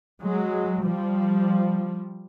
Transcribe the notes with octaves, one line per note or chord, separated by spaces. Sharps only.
F#3 G#3
F3 G3